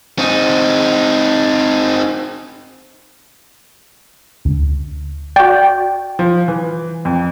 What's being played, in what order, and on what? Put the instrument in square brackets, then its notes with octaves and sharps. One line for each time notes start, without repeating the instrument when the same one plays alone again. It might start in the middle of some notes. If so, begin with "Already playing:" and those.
[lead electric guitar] C4 D#4
[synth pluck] D2
[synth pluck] F#4 D5 [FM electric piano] G5
[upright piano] F3
E3
F2